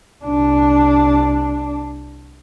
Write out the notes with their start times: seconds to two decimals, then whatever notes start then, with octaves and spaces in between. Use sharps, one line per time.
0.24 C2 D4